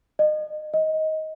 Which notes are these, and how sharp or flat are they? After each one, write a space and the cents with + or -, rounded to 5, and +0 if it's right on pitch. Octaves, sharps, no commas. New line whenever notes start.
D#5 -30
D#5 +15